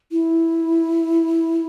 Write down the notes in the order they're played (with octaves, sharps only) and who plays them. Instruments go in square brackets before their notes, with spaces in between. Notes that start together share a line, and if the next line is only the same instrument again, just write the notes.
[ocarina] E4